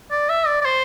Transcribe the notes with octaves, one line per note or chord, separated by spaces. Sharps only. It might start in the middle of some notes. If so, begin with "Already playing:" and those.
D5
E5
D5
D5
C5